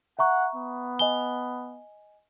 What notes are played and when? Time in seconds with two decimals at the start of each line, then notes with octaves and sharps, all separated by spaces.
0.19 E5 F#5 A#5 C#6
0.55 B3
0.99 D#5 G#5 G7